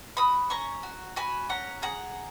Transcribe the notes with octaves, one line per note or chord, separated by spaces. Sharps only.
F#4 B5 D#6
C#4 A#5 C#6
F#4
F#4 G#5 B5
C#4 F#5 A#5
G#4 F#5 A#5